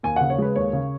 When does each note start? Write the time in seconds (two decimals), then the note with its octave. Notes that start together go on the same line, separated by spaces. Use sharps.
0.03 D#2 G#5
0.16 C#3 F#5
0.30 C#5
0.38 G#3 B4
0.56 D#2 C#5
0.73 C#3